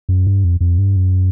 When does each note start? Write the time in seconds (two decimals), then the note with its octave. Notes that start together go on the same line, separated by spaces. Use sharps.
0.09 F#2
0.27 G2
0.44 F2
0.61 F2
0.78 G2
0.96 F#2